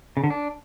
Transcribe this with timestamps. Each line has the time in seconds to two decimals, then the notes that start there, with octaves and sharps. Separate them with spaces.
0.17 C#3
0.24 D3
0.30 D4